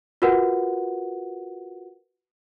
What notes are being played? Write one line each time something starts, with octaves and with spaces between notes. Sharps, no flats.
F4 F#4 A#4 B4 F#5